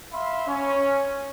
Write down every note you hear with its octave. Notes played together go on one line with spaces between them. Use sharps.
E5 F5 B5 C6
C#4